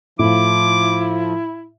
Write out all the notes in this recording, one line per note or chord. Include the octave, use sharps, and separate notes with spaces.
A2 F3 E4 D6